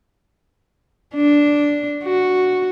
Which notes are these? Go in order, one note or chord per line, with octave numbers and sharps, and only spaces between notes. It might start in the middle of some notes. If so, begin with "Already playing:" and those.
D4
F#4